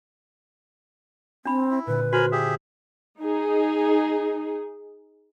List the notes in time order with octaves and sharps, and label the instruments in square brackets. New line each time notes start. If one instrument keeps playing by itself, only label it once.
[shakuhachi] C4 [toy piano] D4 D#4 B5
[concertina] E4
[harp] A#2 D3 [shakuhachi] B4
[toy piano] F#4 C5 [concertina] A#4 G#5 B5
[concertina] G4 G#4 E5
[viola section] D#4 G#4